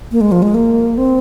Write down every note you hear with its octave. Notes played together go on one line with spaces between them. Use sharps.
A#3
G#3
F3
G#3
A#3
C4